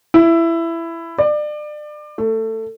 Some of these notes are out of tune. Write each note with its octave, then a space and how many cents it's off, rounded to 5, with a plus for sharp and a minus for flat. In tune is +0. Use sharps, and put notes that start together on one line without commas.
E4 +15
D5 +30
A3 +20